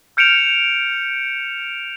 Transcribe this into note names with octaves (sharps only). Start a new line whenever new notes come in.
F6 G6 C#7 D7 E7 F7